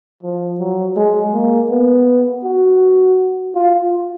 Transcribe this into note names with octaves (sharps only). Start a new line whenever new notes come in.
F3
F#3
G#3
A#3
B3
F#4
F4